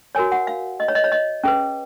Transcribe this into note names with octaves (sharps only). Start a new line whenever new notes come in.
F#4 A#4 C#5 G#5
F#5
F5
D#5
C#5
D#5
C#5
D#5
C#4 G#4 B4